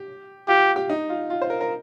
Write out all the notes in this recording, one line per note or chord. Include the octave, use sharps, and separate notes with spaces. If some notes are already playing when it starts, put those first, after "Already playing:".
Already playing: G4
F4 G4
G4
D#4
F4
F4
C5
A#4
A#4